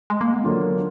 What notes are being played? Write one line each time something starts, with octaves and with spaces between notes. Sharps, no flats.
G#3
A#3
B3
D3 F#3 A#3 D4 F4